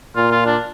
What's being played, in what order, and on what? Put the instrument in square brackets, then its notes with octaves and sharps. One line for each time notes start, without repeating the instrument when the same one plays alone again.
[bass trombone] A#2 [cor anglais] F4
[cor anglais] F4
D4